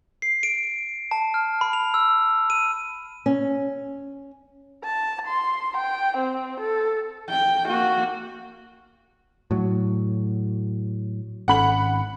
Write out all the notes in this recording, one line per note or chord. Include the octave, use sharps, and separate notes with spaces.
C7
D7
A5
F6
B5
F7
E6
D#7
C#4
A5
C6
G5
C4
A4
G5
A#3 F#4
A2 F#3
G#1 C#4 F#5 B5 F#7